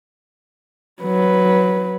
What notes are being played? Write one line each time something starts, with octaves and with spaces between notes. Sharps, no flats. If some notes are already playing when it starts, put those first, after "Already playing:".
F#3 B4